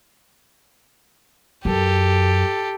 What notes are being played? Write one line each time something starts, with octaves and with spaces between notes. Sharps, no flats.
F#2 G4 A4